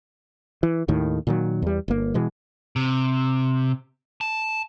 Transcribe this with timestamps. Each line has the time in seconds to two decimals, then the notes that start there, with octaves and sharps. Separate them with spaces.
0.63 E3
0.88 D#2 A2 D#3
1.27 A#2 D#3 F#3
1.62 E2 G3
1.88 G1 A#3
2.14 B2 E3 G#3
2.76 C3
4.21 A5